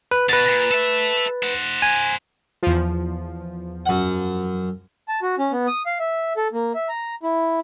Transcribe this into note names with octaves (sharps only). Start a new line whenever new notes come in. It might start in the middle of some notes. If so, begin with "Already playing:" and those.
B4
B2 B4 A6
A#2
A4 E5
C5 F#5
G#5
E2 F3
F#2 F#5
A5
F#4
C#4
B3
D#6
F5
E5
A4
A#3
E5
A#5
E4